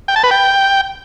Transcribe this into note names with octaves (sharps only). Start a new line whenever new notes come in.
G5
A5
B4
G5